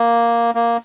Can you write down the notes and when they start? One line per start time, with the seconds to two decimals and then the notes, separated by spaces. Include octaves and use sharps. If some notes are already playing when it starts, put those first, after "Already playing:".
Already playing: A#3
0.55 A#3